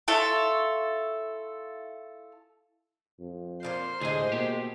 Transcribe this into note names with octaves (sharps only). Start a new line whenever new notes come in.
E4 F4 A4 C#5
F2
A#2 F3 C5 F5
D2 A2 C3 G#3 G#4
B2 A#3 G4